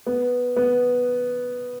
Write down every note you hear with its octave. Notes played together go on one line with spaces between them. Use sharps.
B3
B3